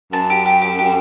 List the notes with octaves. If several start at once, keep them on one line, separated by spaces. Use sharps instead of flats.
F#2 A5
G4
G4
G4
G4